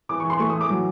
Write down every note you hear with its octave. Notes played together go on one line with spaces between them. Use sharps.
E3 D6
C#6
E3
C6
A3 C#6
D#6
E3
D6
F#3